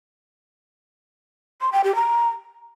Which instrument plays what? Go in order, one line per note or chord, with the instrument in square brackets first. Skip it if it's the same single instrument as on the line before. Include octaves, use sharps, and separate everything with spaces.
[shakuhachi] C6
G5
G4
A#5